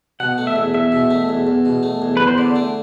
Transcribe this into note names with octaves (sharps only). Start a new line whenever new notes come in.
B2 F#5
A3
E5
E2
E2 E5
B2
A3
E2
E2
B2
A3
E2
E2 B4
C5
D3 D5
A3